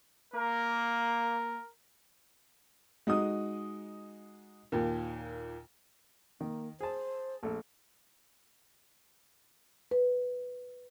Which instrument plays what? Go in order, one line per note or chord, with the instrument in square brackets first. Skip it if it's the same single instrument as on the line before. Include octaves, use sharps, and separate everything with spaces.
[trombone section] A#3 [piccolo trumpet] A#4
[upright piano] G#3 D#4 F#4 D#6
D#2 A#2
[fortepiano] D#3 [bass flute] A#3
[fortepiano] G#4 A5 [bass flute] C5
[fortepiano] A#1 A3 A4
[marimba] B4